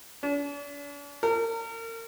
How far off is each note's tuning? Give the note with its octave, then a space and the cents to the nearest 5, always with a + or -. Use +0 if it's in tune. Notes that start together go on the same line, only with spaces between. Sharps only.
D4 -45
A#4 -35